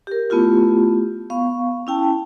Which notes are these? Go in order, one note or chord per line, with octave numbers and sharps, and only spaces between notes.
G4 A#4
A3 B3 E4 F4 G4
B3 F5 C#6
C#4 E4 G5 A5